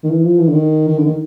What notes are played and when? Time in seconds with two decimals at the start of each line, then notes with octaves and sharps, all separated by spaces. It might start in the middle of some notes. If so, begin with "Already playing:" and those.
0.03 D#3
0.10 E3
0.24 F3
0.39 E3
0.47 D3
0.53 D#3
0.88 D#3
0.98 D3
1.06 D#3